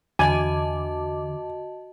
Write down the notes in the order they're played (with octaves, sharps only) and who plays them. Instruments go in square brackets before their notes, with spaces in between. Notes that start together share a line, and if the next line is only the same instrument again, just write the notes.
[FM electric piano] E2 D3 D6 [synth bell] F#4 D#5 A5 [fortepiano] G#5